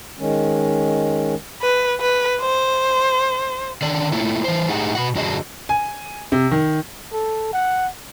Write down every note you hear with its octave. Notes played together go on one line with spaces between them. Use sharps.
D#3 G#3 C#4
B4
B4
C5
D3 D#3 D4 A4 D5
A3 A#3 E4 F4
E3 C5
A2 D#4 G4 G#4 F#5
B2 F#4 F#5
F#2 D3 D4 F#4 G#4 D#5
G#5
C3
D#3
A4
F#5